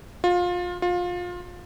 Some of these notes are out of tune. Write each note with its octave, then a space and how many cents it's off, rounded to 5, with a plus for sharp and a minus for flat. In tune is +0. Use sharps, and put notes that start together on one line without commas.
F4 +25
F4 +25